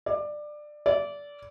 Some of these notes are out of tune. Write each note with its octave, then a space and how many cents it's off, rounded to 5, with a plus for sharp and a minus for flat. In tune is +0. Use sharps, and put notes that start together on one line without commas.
D5 +20
D5 -20